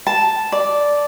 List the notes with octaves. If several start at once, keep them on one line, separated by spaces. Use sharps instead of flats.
A5
D5